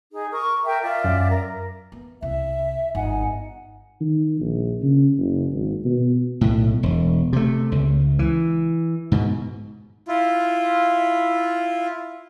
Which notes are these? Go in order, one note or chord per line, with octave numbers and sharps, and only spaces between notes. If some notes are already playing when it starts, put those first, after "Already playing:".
D#4 G#4
A#4 C#6 D#6
A#4 E5 G5
F4 D5 E5
F#2
A#4
B3
C2 E5
G1 D#4 F#5 G#5
D#3
A#1
C#3
F#1
G#1
B2
B1 A2
E1
C3 A3
C#2
E3
G#2 B2
E4 F4